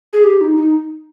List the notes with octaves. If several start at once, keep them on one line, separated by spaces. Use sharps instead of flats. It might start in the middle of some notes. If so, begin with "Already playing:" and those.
G#4
G4
D#4
D#4